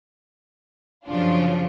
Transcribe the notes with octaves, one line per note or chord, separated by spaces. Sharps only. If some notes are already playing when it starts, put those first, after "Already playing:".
F#2 C#3 F3 D4 F4